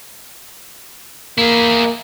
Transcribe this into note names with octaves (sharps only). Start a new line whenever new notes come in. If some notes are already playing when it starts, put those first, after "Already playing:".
A#3 E4 G#4